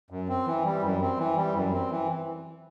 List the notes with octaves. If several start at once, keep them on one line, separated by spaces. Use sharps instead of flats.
F#2
C4
E3
G3
F#2
C4
E3
G3
F#2
C4
E3